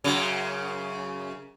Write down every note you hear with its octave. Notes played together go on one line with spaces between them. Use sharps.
F#2 C#3